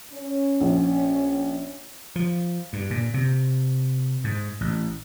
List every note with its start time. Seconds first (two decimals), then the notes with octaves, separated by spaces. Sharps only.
0.13 C#4
0.61 A#1
2.16 F3
2.73 G2
2.91 A#2
3.14 C3
4.24 G#2
4.61 A1